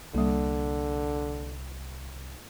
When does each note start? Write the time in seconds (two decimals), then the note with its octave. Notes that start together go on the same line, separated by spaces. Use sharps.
0.15 C2 D3 G3 A#3